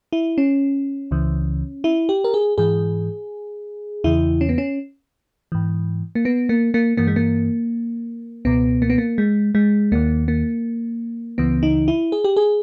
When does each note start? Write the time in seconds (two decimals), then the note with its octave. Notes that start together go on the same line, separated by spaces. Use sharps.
0.13 E4
0.38 C#4
1.11 C#2 C#3 E3
1.84 E4
2.09 G4
2.24 A#4
2.34 G#4
2.58 G#2 E3 G#4
4.04 E2 C#3 E3 E4
4.41 C#4
4.49 B3
4.58 C#4
5.52 G#2 E3
6.15 A#3
6.25 B3
6.49 A#3
6.74 A#3
6.97 G2 E3 A#3
7.07 G#3
7.16 A#3
8.45 C#2 B2 B3
8.82 A#3
8.90 B3
8.98 A#3
9.18 G#3
9.55 G#3
9.92 D#2 D#3 A#3
10.28 A#3
11.38 C#2 C#3 E3 B3
11.63 D#4
11.88 E4
12.12 G#4
12.24 G4
12.37 G#4